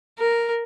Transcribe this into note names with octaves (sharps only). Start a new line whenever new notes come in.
A#4